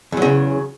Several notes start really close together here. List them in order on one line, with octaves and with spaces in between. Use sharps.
E2 F#3 C#3